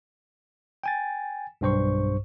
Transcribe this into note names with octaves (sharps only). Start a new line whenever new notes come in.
G5 G#5 A6
B1 G2 C5 C#6